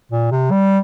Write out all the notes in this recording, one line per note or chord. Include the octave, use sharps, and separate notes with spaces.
A#2
C3
G3